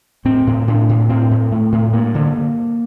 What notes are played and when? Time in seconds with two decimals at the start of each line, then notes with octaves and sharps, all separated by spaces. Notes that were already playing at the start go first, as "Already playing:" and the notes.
0.25 A2 C4
0.47 A2
0.68 A2 D4
0.89 A2
1.09 A2 C4
1.31 A2
1.52 A2 A3
1.72 A2
1.93 G2 A#3
2.15 D3